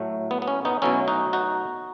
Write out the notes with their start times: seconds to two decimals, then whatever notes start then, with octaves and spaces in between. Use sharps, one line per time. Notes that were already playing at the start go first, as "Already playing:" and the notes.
Already playing: A2 F#3 A3
0.31 B3
0.42 B3
0.48 C#4
0.65 B3 D#4
0.82 B2 F#3 A3 C#4 E4
1.08 D#4 F#4
1.33 D#4 F#4